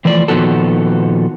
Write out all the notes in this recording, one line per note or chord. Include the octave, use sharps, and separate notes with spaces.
E3 F3 A3 D5
A#2 D#3 F3 B3 F#4 A4